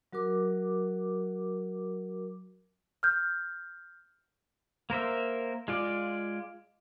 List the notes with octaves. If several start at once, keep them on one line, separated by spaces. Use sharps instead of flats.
F#3 F#4 A#4 D6
F6 G6
A#3 A#4 C5 E5
G#3 F4 D5